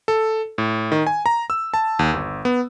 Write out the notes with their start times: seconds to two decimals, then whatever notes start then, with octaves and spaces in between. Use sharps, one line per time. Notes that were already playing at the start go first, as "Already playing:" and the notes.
0.08 A4
0.58 A2
0.92 D#3
1.07 G#5
1.26 A#5
1.50 E6
1.74 A5
1.99 D#2
2.13 G1
2.45 B3